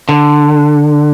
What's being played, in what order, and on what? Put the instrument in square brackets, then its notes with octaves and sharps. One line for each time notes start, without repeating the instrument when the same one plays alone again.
[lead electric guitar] D3